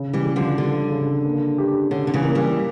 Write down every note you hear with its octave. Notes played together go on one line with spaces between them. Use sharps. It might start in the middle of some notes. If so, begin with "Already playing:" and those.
Already playing: C#3
E3 G3
C#3
D3 F3
D3 G3
C#3
A#3
G4
D3 C#4
D3
C#3 E3
A#3
E3 G3